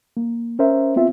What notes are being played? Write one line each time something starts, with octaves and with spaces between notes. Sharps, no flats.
A#3
C#4 A#4 C5 E5
B3 C4 F4 E5